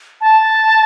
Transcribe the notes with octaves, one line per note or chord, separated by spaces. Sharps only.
A5